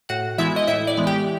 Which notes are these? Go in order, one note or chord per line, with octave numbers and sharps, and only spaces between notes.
A2 F#4 F#5
E3 G#3 B3 E4 E5
D#5
A2 E4 E5
D5
E3 G#3 B3
G4 G5